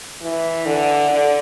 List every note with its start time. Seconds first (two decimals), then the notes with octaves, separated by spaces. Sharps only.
0.22 E3
0.66 D3
1.10 D3